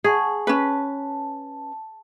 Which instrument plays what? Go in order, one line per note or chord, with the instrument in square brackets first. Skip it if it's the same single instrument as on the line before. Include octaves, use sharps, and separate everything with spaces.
[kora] G#4 [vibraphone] F#5 A5 C#6
[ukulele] C#4 B4 [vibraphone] A5